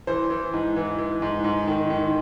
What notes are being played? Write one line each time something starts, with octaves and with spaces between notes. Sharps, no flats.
E3 C5
E3
G#2
E3
E3
G#2
G#2
D#3
D#3